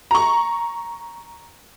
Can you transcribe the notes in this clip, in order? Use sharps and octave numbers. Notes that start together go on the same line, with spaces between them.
A#5 C#6